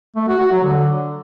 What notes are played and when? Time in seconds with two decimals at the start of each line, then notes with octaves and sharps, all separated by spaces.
0.16 A3
0.28 F#4
0.40 F#4
0.52 F#3
0.64 D3